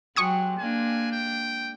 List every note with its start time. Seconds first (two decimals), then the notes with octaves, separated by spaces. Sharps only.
0.16 F#3 G#3 G4 C#6 D#6 G#6
0.59 A#3 D4 G#5
1.12 G5